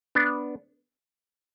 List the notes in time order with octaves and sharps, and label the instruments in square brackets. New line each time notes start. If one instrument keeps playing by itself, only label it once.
[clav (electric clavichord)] B3 D4